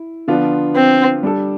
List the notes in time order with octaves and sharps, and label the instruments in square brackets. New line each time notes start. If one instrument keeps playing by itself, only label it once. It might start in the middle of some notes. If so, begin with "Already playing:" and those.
Already playing: [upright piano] E4
D3 F3 B3 D4 F4
[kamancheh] C4
[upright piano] G3 D4 A4